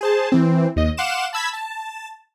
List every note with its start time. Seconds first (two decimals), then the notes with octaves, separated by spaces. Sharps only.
0.01 G#4 C5 A5
0.32 E3 C4
0.76 D#2 D#5
0.97 F5 F#5 C6 D6 E7
1.33 A5 B5 E6 G#6 B6
1.53 A5